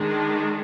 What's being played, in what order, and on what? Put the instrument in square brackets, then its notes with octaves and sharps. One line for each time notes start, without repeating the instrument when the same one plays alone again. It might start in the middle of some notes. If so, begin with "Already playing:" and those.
Already playing: [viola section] D#3 G#3 D4